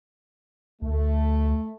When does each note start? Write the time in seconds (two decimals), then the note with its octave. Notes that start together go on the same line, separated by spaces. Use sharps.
0.82 D2 A3